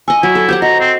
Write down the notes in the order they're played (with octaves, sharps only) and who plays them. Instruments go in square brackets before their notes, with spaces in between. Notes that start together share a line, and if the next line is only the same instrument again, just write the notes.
[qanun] D#5 C#6 [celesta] G#5 E6
[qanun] F#3 [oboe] E4
[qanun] A4
[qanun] G4 C5 F#5 [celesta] G6
[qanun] F#4 [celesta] D#5 [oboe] A#5
[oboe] C4